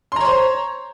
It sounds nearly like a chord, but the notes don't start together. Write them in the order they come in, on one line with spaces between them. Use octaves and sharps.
C6 A#5 C#5 C5